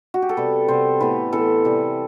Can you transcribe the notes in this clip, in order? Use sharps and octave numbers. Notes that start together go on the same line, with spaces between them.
F#4
G4
A4
C3 G3 B3 B4
C3 G3 B3 C5
A2 E3 B3 B4
A2 E3 B3 A4
C3 E3 G3